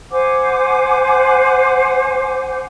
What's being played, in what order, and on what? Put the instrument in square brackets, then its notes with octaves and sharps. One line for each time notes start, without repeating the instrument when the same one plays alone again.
[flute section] C5 F#5 G#5 D6